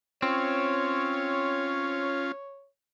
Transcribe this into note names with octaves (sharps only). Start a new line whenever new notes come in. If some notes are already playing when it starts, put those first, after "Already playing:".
C4 C#4 F4 C#5